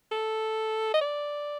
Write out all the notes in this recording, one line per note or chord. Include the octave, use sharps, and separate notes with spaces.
A4
D#5
D5